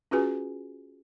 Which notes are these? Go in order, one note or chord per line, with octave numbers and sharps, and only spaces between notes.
C#4 F4 F#4 G#4 B4 G#5